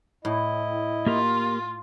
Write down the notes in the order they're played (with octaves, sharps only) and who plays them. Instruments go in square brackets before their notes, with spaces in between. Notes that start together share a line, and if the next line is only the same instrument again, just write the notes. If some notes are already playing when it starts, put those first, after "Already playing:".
[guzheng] A2 [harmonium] E4 D#5
[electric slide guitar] A#3 G4 A#4 [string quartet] F4